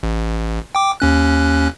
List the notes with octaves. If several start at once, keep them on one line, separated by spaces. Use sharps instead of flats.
A1
G5 D6
D#2 C#4 F#6